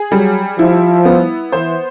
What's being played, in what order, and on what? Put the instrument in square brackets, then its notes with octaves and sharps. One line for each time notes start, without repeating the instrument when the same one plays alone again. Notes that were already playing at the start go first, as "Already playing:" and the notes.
Already playing: [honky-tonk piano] G#4
[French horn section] F#3 [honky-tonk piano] G3
[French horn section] F3 [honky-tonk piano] E4
[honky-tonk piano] B3
[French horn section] E3 [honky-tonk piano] C5